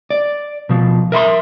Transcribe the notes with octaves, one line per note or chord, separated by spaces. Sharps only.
D5
B2 F3
A#4 E5 B5 C6